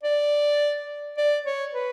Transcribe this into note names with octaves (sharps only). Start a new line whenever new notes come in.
D5
D5
C#5
B4